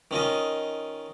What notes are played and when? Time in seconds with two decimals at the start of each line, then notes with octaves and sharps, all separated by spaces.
0.11 D#3 C#4 F4 D#5